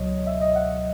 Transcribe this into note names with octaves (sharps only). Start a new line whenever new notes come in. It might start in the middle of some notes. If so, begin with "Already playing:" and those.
Already playing: C#2 B2 F#3 C#5 D#5
E5
D#5
F#5